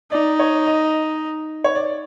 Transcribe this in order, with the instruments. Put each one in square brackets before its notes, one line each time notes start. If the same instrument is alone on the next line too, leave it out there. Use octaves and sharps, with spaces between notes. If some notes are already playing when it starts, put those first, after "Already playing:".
[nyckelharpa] D#4 [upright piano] D5
[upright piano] C#5
D#5
C#5
D5